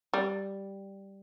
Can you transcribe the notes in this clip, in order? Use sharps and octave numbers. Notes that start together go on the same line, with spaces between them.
G3